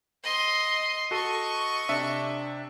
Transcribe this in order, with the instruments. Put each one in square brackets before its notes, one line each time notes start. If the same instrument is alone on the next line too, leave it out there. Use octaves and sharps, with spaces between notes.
[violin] D#5 C6
[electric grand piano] F#4 A4 D#7 [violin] D#5 C#6
[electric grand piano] C3 D4 E5